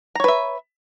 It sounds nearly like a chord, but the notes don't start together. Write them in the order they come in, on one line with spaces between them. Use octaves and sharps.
A#5 C#5 B4 E5